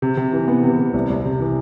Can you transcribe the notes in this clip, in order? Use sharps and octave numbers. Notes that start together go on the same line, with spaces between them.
C3
C3
E3
B3
C3
C3
C2
C2
C3
E3